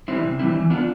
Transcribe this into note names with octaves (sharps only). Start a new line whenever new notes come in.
E3 G3 C4 E4
C3
E3 G3 C4 E4
E3
B3 D4 F4